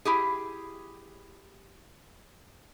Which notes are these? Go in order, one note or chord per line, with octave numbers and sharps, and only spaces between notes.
E4 G4 G#4